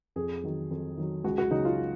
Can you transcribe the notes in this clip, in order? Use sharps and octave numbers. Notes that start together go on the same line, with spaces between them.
F2 G#4
D#3 F#3
F2
D#3 F#3
C#2 F#4
F#4
C#3 F#3 D#4
F4